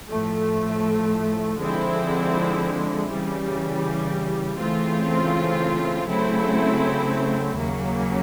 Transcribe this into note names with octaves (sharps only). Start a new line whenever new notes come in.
A2 F3 A3
D3 F3 G#3 C4 E4
C#3 E3 G3
C#3 E3 A3 C4 F4
C#3 F#3 A3 C4 E4
D#2 C#3 F#3 A#3